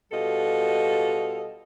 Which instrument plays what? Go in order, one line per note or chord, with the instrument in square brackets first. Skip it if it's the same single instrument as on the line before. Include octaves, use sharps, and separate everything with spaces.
[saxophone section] B2 G3 F4 A4 D#5